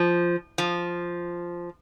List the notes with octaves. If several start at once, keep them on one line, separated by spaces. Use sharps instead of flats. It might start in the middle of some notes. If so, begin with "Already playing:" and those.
Already playing: F3
F3